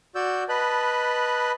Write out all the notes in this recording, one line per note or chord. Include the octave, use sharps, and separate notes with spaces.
F#4 D5 E6 G6
B4 D#5 A5 B5 F#6